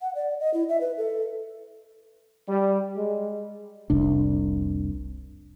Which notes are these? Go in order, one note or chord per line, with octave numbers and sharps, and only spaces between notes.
F#5
D5
D#5
E4
E5
B4
A4
G3
G#3
F1 C2 D4